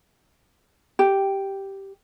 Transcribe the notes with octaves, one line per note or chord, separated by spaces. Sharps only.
G4